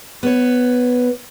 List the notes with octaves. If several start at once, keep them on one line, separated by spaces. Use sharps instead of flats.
B3 C#5